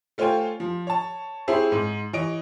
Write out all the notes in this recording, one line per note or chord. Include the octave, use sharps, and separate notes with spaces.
A3 F4 C5 C#5 G5 G#5
F3
C#5 A5
C4 E4 G#4 C5 C#5 E5
G#2
E3 C#5 D#5 D7